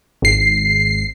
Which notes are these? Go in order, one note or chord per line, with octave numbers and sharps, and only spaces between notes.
G#1 C7